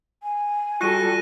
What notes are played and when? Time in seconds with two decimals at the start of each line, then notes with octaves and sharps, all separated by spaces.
0.23 G#5
0.81 G3 F4 F#4 A4 F#6 A#6 D#7